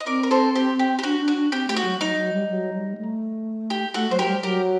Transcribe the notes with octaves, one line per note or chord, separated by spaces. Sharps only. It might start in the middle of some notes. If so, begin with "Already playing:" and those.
D#5
C4 A#4 D5
A#4
A4 C5
G4
G4
G4
D4 F#4
D4
F#4
D4
C4 G4
A3 G4
F#4
F#3
F#3 D#4
F#3
G3
F#3
G3
A3
G4
A3 F#4 A4
F#3 C5
G4 A#4
G3
F#3 G4 A#4